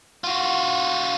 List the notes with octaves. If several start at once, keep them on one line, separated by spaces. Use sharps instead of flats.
F4 F#4